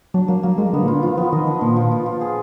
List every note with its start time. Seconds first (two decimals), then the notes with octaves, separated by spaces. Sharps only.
0.14 F#3 D4
0.28 F#3 A#3
0.43 F#3 A#3
0.58 G#3 A#3
0.73 D3 B3
0.83 A#2
0.88 D3 F4
1.03 F3 F4
1.17 F3 B3
1.32 D#3 D#5
1.47 D4
1.61 A#2 F3
1.76 F3
1.91 F4
2.06 F4
2.21 G#4